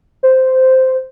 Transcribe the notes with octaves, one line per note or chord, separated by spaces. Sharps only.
C5